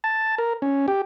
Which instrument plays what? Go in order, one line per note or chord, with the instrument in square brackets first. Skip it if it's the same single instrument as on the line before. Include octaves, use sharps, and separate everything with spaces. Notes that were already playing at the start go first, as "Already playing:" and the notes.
[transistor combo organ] A5
A#4
C#4
G4